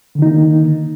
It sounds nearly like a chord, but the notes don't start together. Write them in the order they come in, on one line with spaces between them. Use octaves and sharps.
D3 D#3 D#4 A#3